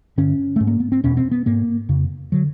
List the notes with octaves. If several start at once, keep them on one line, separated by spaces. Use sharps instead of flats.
G2 D3 C#4
G#2 A3
A#3
B3
C4
E2 B2 C#4
C4
B3
G#2 A#3
F2 C#3
D3 F#3